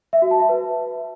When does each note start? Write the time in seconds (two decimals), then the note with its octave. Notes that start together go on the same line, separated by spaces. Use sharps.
0.13 E5
0.22 F#4
0.31 A5
0.40 E5
0.49 B4